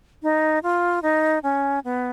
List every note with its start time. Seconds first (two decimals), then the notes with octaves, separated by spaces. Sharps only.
0.23 D#4
0.63 F4
1.02 D#4
1.43 C#4
1.84 B3